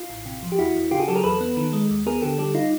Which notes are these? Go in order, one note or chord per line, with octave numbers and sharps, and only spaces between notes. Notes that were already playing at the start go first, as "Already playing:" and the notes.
Already playing: F4
A1
C3
F3
G4
E2 E4 F#4
E2
C#3 F4 G4
F#4 G#4
F#3 G4 A4
G#4 A#4
E2 A4 B4
B3
D#3
G#3
D#2
B3 G#4 A#4
D3 G4 A4
G3 G4 A4
D#4 F4